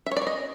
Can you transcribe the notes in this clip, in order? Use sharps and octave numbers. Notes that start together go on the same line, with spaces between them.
E5
C#5
D5
C#5
D#5